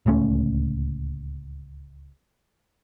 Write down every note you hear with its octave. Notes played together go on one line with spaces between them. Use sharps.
D1 C#2 A3 C#4